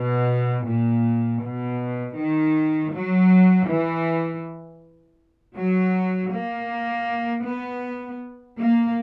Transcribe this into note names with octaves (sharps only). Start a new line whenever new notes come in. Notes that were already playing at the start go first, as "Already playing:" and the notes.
Already playing: B2
A#2
B2
D#3
F#3
E3
F#3
A#3
B3
A#3